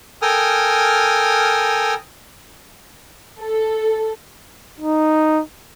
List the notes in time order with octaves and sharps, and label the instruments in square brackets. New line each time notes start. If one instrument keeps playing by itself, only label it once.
[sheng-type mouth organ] A4 A#4 G5 G#5 D#6 F6
[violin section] A4
[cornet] D#4